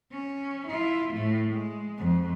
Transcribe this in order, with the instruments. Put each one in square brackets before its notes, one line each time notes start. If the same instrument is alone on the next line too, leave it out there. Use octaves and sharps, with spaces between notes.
[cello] C#4
E4 F4
A2 A3
G#3
F2